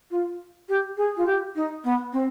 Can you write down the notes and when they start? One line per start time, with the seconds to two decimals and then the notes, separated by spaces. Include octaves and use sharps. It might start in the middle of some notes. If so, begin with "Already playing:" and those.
0.10 F4
0.68 G4
0.97 G#4
1.16 F4
1.26 G4
1.55 D#4
1.84 B3
2.12 C4